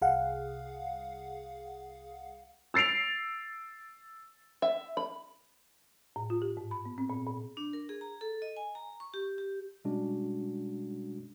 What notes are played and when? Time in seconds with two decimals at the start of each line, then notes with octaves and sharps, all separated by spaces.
0.02 C2 G#4 F5 F#5
2.74 E6 A6 C7 D7 F7
4.62 E5
4.97 B5
6.16 A2
6.30 F4
6.42 G4
6.57 G#2
6.71 B5
6.85 B3
6.98 C4
7.10 A#2
7.26 A#2
7.57 D4
7.73 A#4
7.89 G#4
8.01 A#5
8.21 A4
8.42 D#5
8.57 G#5
8.75 A#5
9.00 C#6
9.14 G4
9.38 G4
9.85 B2 G3 G#3 C#4 D4 F#4